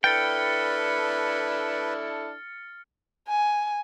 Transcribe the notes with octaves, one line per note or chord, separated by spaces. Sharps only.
D4 E4 A4 B4 G5 F6 A6 C#7
G#5